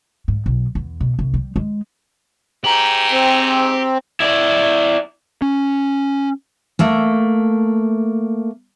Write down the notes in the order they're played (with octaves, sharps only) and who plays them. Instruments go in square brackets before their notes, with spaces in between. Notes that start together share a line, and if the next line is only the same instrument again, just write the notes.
[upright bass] G#2
B1
E2
B2
C2
G3
G#3
[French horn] G#2 [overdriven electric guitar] G4 [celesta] A#5 F#7
[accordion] C4
[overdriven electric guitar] E4 D5
[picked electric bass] C#4
[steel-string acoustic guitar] A3 A#3